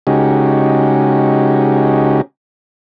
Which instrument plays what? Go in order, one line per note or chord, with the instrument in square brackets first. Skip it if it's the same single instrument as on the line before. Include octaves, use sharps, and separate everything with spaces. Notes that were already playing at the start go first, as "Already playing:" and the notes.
[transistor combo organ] C#3 G#3 C#4 D#4 F#4 G4